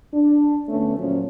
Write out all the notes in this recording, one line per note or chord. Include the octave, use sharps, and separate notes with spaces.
D4
D2 A3 B3 C#4
A#2 F3 F#3 C#4